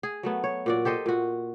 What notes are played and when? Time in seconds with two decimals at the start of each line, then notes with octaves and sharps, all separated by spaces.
0.03 G#4
0.23 F#3 A3 B3
0.44 C#5
0.66 A#2 F#4 D5
0.85 G4 A4 C5 D#5
1.06 A#2 F#4